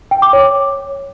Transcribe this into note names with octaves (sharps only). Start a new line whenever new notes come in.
G5
D6
C#5